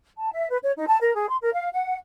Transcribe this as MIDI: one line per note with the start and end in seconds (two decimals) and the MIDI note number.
0.17 0.31 81
0.32 0.48 76
0.50 0.57 71
0.62 0.72 73
0.77 0.85 63
0.88 0.98 81
1.01 1.13 70
1.14 1.29 68
1.29 1.37 84
1.42 1.52 70
1.55 1.69 77
1.73 1.96 78